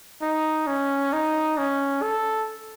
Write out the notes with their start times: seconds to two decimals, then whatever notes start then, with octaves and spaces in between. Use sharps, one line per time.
0.22 D#4
0.67 C#4
1.13 D#4
1.58 C#4
2.02 A4